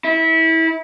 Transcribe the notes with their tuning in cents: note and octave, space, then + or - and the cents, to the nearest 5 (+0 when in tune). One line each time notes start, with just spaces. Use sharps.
E4 -25